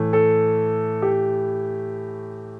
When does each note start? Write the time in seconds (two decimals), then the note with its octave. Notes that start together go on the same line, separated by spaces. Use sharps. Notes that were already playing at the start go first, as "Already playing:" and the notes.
Already playing: A2 E3 A3
0.13 A4
1.02 G4